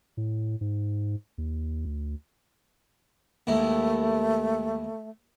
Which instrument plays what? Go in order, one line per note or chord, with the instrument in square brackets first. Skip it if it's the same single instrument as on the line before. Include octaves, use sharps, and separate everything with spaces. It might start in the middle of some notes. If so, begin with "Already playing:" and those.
[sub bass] A2
G#2
D#2
D2
[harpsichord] D#2 G#2 E4 [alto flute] A3